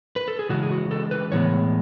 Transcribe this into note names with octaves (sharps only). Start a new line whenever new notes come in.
B4
A4
G#4
C#3 E3 G#3 F#4
G#4
F#4
A4
B4
A2 E3 G#3 B3 C#5